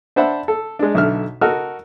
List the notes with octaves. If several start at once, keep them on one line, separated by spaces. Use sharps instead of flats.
D4 C5 E5 F#5 A5 B5
A4
G#3 D4
B1 D3 E5 F6
F#4 A4 A#4 D#5 E6 F6